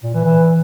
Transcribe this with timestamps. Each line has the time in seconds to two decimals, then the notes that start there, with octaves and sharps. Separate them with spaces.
0.03 A#2
0.14 E3
0.25 E3